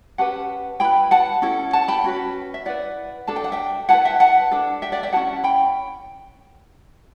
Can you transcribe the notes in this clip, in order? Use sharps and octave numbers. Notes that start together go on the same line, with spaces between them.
C#4 G4 B4 F#5 A5
E4 B4 G5 B5
F#5 A5
C#4 E4 A4
F#5 A5
G5 B5
C#4 F#4 B4
E5
E4 B4 D5 F#5
D4 A4 A5
G5
F#5
E5 G5
E4 B4 F#5 A5
E5 G5
F#5 A5
D4 A4
E5 G5
D5 F#5
E5 G5
C#4 E4 G4 F#5 A5
G5 B5